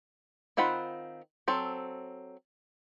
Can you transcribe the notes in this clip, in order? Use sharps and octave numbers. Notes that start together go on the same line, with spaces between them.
D#3 C4 F4 F#5 B5
F#3 C4 A4